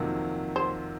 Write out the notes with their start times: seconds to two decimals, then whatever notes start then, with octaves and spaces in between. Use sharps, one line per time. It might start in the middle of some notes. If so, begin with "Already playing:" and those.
Already playing: F2 C3 D#3 F#3 A#3
0.56 C5